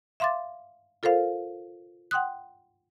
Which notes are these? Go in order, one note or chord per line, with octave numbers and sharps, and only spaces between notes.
E5 F5 C6 D6 A6
F4 A4 A#4 C5 F5
F#5 G5 C6 D#6 F#6